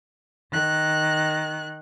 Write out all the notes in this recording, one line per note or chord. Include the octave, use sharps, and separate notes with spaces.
D#3 F#6